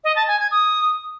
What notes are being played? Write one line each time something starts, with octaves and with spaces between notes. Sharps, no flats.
D#5
A5
G#5
G#6
D#6